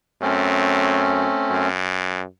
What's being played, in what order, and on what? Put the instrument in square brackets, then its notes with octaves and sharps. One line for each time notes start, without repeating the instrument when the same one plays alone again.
[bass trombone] F#2 [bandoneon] A3 C4 C#4
[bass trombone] F#2